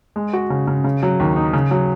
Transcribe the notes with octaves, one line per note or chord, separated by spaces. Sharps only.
G#3
F#4
C#3
C#3
C#3
F#3
D#2
D#4
C#3
F#3